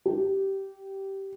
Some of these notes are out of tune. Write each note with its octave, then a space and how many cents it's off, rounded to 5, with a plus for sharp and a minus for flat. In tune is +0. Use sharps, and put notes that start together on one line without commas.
G4 -15